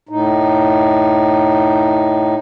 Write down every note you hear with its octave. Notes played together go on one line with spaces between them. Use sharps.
A2 D#4